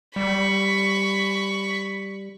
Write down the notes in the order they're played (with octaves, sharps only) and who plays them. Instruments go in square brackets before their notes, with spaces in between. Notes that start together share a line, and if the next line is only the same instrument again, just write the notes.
[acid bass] G3 [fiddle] B5 C#6